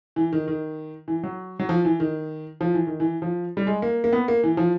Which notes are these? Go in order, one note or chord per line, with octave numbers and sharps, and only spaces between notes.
E3
D#3
D#3
E3
F#3
F#3
F3
E3
D#3
F3
E3
D#3
E3
F3
G3
G#3
A#3
A#3
B3
A#3
E3
F3